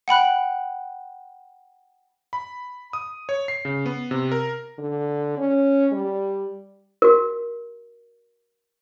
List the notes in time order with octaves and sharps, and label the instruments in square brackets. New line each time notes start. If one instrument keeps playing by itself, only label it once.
[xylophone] F#5 G5 B5 F#6
[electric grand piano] B5
D#6
C#5
C7
C#3
B3
C3
A#4
[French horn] D3
C#4
G3
[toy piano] F#4 A#4